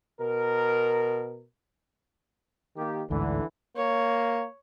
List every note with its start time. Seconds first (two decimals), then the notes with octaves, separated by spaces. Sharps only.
0.20 B2 A#4
2.77 D#3 A#3 G4
3.10 A1 D2 G#2 D3 E3
3.77 A#3 C#5